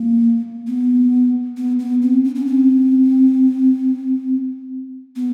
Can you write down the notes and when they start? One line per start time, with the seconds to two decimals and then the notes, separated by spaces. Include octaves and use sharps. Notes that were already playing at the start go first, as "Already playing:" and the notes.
Already playing: A#3
0.67 B3
1.57 B3
1.79 B3
2.02 C4
2.24 C#4
2.35 C#4
2.46 C4
5.16 B3